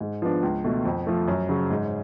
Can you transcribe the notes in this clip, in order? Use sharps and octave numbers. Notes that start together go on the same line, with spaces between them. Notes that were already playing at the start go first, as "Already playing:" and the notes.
G#2
F3 B3 D4
C#2
B2 A3
F2
F3 A3
F#2
C#3 F#3
G#2